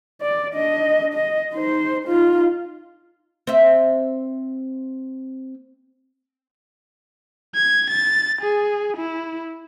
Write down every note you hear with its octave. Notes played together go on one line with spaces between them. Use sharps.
D5
D4 D#5
D#5
D#4 C5
D#4 F4
C4 E5
G#6
A6
G#4
E4